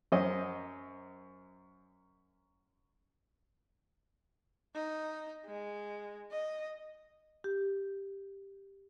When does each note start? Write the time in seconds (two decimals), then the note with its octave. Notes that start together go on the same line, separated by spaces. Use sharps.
0.12 F#2 C5 D#5
4.75 D#4
5.45 G#3
6.31 D#5
7.44 G4